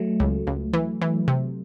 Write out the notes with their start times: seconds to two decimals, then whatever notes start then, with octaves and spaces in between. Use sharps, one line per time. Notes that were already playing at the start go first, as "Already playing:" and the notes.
Already playing: F#3 A3
0.20 C#2
0.47 C#2
0.73 E3
1.02 E3
1.28 C3